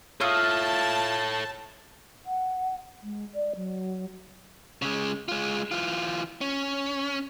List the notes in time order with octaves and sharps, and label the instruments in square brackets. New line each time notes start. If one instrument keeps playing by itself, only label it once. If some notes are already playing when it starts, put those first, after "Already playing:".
[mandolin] F4 E5 D#6 [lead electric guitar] A4 C#5 [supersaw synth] A5
[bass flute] F#5
G#3
D5
F#3
[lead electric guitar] C#3 G#3
G#3 F4
E3 F4
C#4